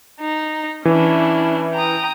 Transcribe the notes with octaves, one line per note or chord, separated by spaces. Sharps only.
D#4
E3 C#4 D4 E4
G5 A#5 D#6